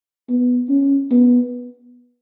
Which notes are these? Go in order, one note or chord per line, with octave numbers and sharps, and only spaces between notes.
B3
C#4
B3